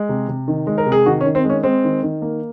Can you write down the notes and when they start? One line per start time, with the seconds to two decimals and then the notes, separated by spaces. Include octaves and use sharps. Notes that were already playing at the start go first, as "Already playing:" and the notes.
Already playing: G#3
0.09 C3
0.29 C3
0.48 D#3
0.67 G#3
0.78 A#4
0.87 C3
0.92 G#4
1.06 D#3 F#4
1.21 C#4
1.26 D#3
1.35 C4
1.45 G#3 C#4
1.63 G#3 C4
1.84 D#3
2.03 D#3
2.22 A#3